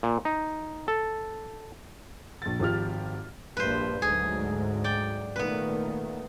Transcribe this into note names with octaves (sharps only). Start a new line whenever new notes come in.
A#2
D#4
A4
A#1 A6
G#1 F3 G4 F6
A#1 G2 B4 C5
D2 G#2 F#3 G#4
D5 G5
A#2 D#3 A3 B3 B4